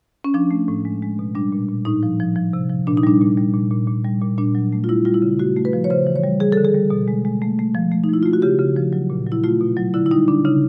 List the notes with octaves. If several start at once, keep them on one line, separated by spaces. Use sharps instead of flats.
C#4
F3 D4
A3
A2
G#3
G#3
B2
G3 D4
A#2
A#2
A2 D#4
F3
F3
F3
C3
F3
A#2 D4
D#4
G3 D4
A#2
G3
A#2
A#2
A#2
G3
A#2
A#2 D4
F#3
A3
F4
G3 E4
G3 F4
E4
C#3
A3 F#4
A3
B4
F3
C#5
C#3 C5
E3
C#5
G3
G3 G#4
D3 A4
G#4
G3
B2
G#3
G#3
A3
A3
F3
A3
D#4
F3 E4
A3 F4
F#4
C#3 G4
C#3
F3
F#3
A#2
F#3
E4
A3 F4
B2
F#3
D3 E4
E4
G3 D#4
D3 D4
C#3 D#4